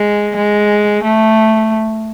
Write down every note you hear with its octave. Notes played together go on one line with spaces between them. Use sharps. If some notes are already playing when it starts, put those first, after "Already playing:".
Already playing: G#3
G#3
A3